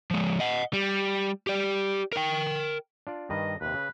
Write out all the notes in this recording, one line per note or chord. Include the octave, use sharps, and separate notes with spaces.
F3 G#3
D#5 F#5
G3
G4 D5
A#4 G5
D4 F4 D5
G2 D#3 B4 D#5
D#2 C3 B4
C#3